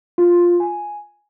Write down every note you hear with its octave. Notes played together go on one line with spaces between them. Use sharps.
F4
G#5